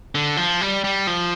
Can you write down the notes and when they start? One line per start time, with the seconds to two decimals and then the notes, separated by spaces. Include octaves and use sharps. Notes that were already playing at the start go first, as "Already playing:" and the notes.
0.15 D3
0.37 F3
0.61 G3
0.84 G3
1.07 F3